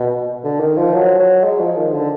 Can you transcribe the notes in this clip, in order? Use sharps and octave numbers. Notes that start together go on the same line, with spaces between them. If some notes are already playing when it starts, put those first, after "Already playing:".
Already playing: B2
D3
D#3
F3
F#3
F#3
G#3
F3
D#3
D3